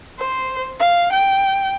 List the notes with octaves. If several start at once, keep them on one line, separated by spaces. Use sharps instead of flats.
C5
F5
G5